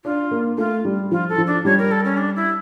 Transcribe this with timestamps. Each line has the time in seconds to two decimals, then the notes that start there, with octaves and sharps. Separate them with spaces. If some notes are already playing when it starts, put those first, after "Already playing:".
0.04 D4 F4
0.31 A#3
0.58 A3 F4
0.85 G3
1.11 F3 F4
1.29 A4
1.38 F3
1.47 D4
1.65 G3 C#5
1.79 A#4
1.92 A4
2.05 C#4
2.18 D4
2.36 E4